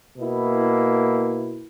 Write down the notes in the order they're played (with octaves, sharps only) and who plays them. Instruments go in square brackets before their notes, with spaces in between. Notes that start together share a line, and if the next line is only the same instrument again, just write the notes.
[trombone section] B2 A#3 E4